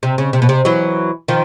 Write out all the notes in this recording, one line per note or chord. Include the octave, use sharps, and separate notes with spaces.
C3
C#3
C3
B2
C3
E3 F#3
D#3 F3